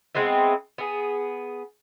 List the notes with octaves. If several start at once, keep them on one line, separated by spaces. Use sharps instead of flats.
G#3 B3 C4 E4
B3 G#4